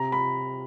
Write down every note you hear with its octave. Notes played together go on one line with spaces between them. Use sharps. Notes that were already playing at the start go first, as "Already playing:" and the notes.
Already playing: C3 A#5
B5